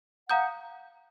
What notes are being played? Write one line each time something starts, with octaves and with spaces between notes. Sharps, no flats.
F5 F#5 A#5 D#6 G6